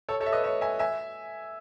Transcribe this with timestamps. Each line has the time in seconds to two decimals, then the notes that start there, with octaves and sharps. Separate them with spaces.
0.09 A4 C#5
0.20 A4 C#5
0.26 E5
0.33 B4 D#5
0.44 C#5 E5
0.61 E5 G#5
0.79 E5 G#5